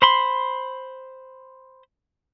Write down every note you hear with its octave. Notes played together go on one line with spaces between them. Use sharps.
C5 B5 C6